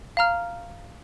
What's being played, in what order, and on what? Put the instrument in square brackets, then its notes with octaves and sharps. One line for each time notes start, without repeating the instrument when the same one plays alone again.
[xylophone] F5 A#5 F6